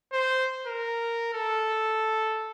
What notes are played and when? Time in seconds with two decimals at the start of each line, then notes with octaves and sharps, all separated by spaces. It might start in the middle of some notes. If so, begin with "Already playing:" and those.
0.13 C5
0.67 A#4
1.34 A4